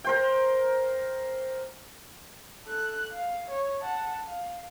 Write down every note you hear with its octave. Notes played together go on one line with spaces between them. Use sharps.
A#4 C5 G5
A4 F#6
F5
C#5
F#5 A5
F5